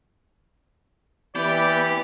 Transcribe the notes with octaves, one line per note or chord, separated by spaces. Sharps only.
E3 B3 G4 D5